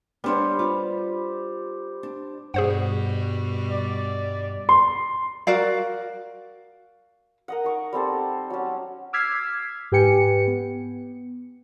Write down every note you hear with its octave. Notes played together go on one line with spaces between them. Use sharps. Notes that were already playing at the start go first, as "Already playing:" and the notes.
G3 B3 D4 C5 C#5
F4
D4
G2 B2 G3 G#4 C5 F#5
D5
C6
F#4 A#4 D5 F5
A#4 D#5 F#5
D#4 C#6 D6
G3 C4 A4 C5
F#3 C#4
D6 E6 F6 G#6 B6 C7
G#2 G4 B4 G5 G#5 C#7
B3